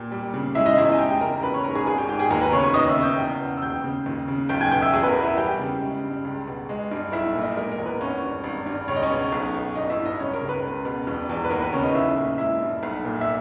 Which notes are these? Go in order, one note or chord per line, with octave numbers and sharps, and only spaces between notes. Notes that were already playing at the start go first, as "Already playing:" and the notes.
Already playing: A#2 G4 G5
G3
C#3
G#3 E4 E5
D#4 D#5
E2 E4 E5
G#5
G#3 G4 G5
C#3 A#4 A#5
A#5
A#1 B4 B5
C#5 C#6
G#2 A#4 A#5
G#4 G#5
G#1 G#4 G#5
G4 G5
G#2 G4 G5
G#4 G#5
D#2 A#4 A#5
B4 B5
C#3 C#5 C#6
C#5 C#6
D#2 D#5 D#6
E5 E6
C#3
G5 G6
E2
B2
E6
D#2 G5 G6
C#3
D#2
C#3
B1 G5 G6
G#5 G#6
B2 G5 G6
E5 E6
E2 G#4 G#5
B4
A#4
B2
E4 E5
G3 G4 G5
C#3
G#3
G2
C#2
B2
G#3
G2
B1 E4 E5
A#2
D#4 D#5
G#3 A#4
A#4
E2
B4
G#1 C#4 C#5
G2
G#1
G2
C#2 C#5
D#5
C#4 C#5
B2
B1
B2
G1 D#4 D#5
E4 E5
G2
D#4 D#5
C#2 C#4 C#5
A#4
C#3
B4
C#2
B2
E1
E2
B4
D#2 A#4
B4
C#3 C#4 C#5
D#4 D#5
B1 E4 E5
A#2
G#3 E4 E5
G2
B1
A#2
E5